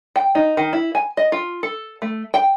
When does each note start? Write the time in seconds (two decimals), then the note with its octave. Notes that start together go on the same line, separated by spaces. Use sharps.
0.16 G5
0.35 D#4
0.57 D#3
0.73 E4
0.95 G#5
1.17 D#5
1.32 F4
1.63 A4
2.02 A3
2.34 G5